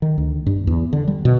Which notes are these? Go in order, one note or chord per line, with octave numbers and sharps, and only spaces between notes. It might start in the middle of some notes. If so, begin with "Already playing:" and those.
D#3
D2
G2
E2
D3
G3
B2